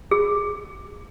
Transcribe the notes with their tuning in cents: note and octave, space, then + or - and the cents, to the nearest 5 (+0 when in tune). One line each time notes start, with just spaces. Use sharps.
G#4 -10